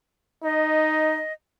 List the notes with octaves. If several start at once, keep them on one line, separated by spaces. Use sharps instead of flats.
D#4 D#5